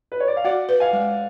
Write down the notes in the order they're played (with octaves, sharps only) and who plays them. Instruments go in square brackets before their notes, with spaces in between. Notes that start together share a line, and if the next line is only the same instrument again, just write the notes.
[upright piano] B4
C#5
D5
F5
[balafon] F#4 [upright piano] D5 F#5
[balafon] B4
[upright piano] F5 G#5
[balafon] G#3